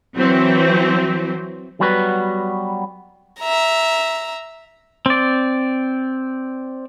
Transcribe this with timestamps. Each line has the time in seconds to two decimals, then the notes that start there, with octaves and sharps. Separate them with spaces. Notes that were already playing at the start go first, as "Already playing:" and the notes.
0.16 E3 F#3 C4
1.80 F#3 G3 B3 F#4 G4 B4
3.40 E5 A#5
5.06 C4 D5